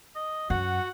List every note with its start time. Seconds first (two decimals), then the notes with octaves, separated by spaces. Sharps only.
0.15 D#5
0.50 F#2 F#4 F#5